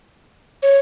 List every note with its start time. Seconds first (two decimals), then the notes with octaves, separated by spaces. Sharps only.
0.62 C#5